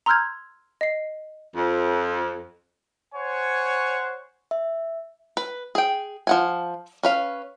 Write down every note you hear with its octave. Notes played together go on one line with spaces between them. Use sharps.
A#5 C6 E6 F6 G6 G#6
D#5 C7
F2
C5 C#5 F#5 G#5 C#6
E5
B4
G#4 G5
F3 F#5 G#5
C#4 B4 F5